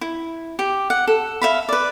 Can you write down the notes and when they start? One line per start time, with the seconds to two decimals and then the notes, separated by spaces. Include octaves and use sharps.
0.01 E4
0.59 G4
0.90 F#5
1.07 A4
1.42 E5 F5 B5
1.69 B4 D5